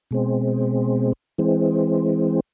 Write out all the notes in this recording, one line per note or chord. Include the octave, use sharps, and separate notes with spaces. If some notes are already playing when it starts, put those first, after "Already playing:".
B2 G#3 C4
E3 G#3 C4